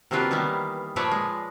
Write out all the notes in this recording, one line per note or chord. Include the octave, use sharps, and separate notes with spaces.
C3 F#3 A#3 D4 F4 B4
D#3 E3 G3 A#3 B3
A#2 F3 A3 B4 C#5 D5
G#3